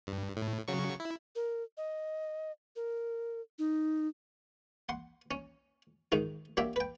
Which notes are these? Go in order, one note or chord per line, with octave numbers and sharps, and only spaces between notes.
G2
A2
C#3 F#3 C#6
E4
A#4
D#5
A#4
D#4
F#5 C6
C#4
G#2 D#3 D#4
F#3 A#3 D4 G4 E5
B4 G5